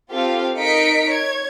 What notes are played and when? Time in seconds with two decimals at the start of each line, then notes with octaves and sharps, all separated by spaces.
0.11 C4 F4 G4 A4 F5
0.58 D#4 A#4 D#5 B6 C#7 D7
1.10 C#5 G#6